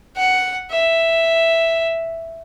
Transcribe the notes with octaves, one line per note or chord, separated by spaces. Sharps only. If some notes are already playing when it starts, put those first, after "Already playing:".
F#5
E5